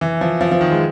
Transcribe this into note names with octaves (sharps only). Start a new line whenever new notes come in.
E3
F3
F3
F3
D#3
G#3